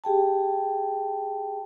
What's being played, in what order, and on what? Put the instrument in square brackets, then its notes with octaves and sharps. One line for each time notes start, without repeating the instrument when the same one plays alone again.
[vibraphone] G4 G#4 G5 A5